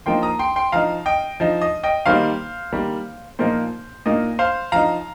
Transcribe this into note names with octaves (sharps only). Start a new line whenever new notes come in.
F3 A#3 D#4 G5 C6
A#5 D#6
G5 C6
G5 C6
F3 D#4 F5 A#5
D#5 G5
F3 D#4
D#5
D#5 G5
D#3 G3 A#3 D#4 C5 F5
D#3 G3 A#3
A#2 F3 A#3 D#4 C5
A#2 A#3 D#4 D#5
C5 F5
F3 D#4 F5 A#5